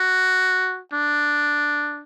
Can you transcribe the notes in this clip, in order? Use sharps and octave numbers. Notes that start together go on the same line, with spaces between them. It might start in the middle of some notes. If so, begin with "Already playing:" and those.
Already playing: F#4
D4